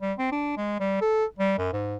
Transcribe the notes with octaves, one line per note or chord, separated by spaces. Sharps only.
G3
C4
D4
G#3
G3
A4
G3
F#2
G#2